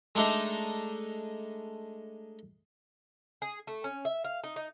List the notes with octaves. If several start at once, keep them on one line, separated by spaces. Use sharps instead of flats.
G#3 A3 D4 D#4
G#4
A3
C#4
E5
F5
D#4
D#4